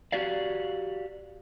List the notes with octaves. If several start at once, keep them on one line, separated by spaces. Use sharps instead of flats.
F#4 G4 D5 F5